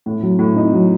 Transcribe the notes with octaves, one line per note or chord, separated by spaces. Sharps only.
A2
F#3
A2
D#4
F#3